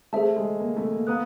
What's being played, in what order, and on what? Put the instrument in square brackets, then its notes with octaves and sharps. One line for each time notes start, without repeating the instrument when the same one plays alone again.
[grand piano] A3 [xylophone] G#4 C5 E5 A5
[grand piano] G#3
A#3
A3
A#3
[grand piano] B3 [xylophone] F5 A#5 D#6 F#6